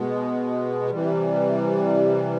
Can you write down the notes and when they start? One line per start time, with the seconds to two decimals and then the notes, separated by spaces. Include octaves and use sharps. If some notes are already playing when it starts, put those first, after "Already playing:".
Already playing: B2 G#3 B3
0.90 C3 E3 G3